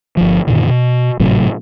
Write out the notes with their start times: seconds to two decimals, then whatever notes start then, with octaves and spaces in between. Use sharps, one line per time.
0.17 G1 F3
0.47 F#2 A#2 D3 D#3
0.69 B2
1.20 G#1 A2 C3 F#3